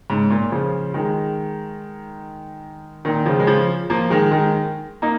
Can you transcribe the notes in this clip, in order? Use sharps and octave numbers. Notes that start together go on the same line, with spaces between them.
G#2 C#3
A#2
C#3 F3
D#3 G#3
A#2 D#3
C#3 F3
G#3
C#3 F3
F3 A#3
D#3 G#3
D#3 G#3
A#3 D#4